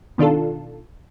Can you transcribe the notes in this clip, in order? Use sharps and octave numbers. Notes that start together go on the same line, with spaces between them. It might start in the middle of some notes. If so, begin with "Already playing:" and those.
B2 D#3 D4 F4 A4